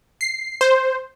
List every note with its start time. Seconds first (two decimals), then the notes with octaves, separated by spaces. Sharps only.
0.21 C7
0.61 C5